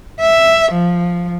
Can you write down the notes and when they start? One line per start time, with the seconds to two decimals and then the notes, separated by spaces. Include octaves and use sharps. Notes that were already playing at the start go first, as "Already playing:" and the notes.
0.20 E5
0.72 F3